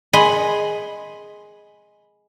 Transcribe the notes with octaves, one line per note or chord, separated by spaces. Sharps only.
G#4 D#5 B5 C6